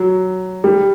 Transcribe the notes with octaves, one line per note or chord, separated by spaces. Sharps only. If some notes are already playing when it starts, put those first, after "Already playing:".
Already playing: F#3
G3